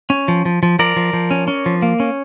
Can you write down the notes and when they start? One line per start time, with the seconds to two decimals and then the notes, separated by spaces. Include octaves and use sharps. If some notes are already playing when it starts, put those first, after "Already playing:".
0.10 C#4
0.28 F3
0.45 F3
0.63 F3
0.79 F3 A#4 D5
0.97 F3
1.13 F3
1.31 C#4
1.48 C#4
1.66 F3
1.82 A#3
2.00 C#4